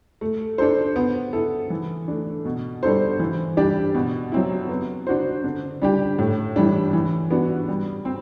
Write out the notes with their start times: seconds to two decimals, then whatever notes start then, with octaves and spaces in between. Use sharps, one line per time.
0.21 A3
0.58 D4 A4 C5
0.96 B3
1.33 E4 A4
1.70 E3
2.08 A3 D4
2.45 B2
2.83 G3 D4 A4 C5
3.19 E3
3.57 G3 D4 G4 D5
3.95 B2
4.32 F#3 C4 E4
4.69 B3
5.07 D4 F#4 C5
5.44 D3
5.82 G3 D4 G4
6.19 A2
6.56 E3 G3 D4
6.93 E3
7.30 B3 D4 F#4
7.68 G3
8.05 C4